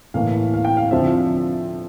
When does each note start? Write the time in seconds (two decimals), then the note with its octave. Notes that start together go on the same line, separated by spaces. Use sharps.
0.14 A2 E3 A#3 F5
0.54 F5
0.65 G5
0.77 F5
0.91 F2 D3 F3 C4 E5